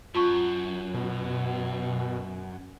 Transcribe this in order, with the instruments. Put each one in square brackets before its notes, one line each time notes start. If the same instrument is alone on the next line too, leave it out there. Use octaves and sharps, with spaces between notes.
[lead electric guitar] F#2 [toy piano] F4 A5 C#6
[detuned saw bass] B2